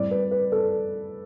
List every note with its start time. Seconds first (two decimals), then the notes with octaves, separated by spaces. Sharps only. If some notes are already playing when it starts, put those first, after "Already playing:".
Already playing: A2 G3 C4 D5
0.11 B4
0.31 B4
0.52 A4